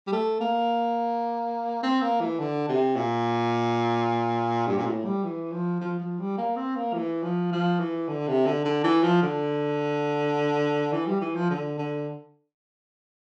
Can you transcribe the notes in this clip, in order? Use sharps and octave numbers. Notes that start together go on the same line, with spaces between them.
G3
A3
A#3
C4
A#3
E3
D3
C3
A#2
G2
A#2
A2
G3
E3
F3
F3
F3
G3
A#3
C4
A#3
E3
F3
F3
E3
D3
C3
D3
D3
E3
F3
D3
E3
G3
E3
F3
D3
D3